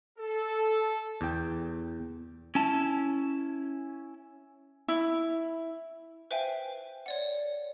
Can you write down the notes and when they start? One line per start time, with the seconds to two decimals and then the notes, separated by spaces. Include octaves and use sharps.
0.19 A4
1.21 E2 G5
2.55 C#4 E4 A5
4.88 E4
6.31 B4 C5 E5 F5 G5 G#5
7.06 C#5 D5 F#5